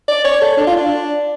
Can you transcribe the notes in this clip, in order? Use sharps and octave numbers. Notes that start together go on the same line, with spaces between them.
D5
C#5
A4
D4
F4
D4